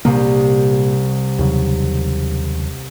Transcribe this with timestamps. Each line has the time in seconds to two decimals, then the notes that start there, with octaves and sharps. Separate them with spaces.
0.05 C2 A#2 A#3
1.39 D#2 C#3 F#3